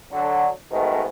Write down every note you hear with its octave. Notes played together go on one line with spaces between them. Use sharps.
D3 F#3
F2 G#2 B2 D#3 A3 B3